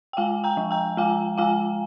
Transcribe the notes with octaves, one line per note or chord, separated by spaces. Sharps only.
G5
G#3 F5 G#5
G5 A#5
F3
G5 A#5
G#3 F5 G#5
G#3 F5 G#5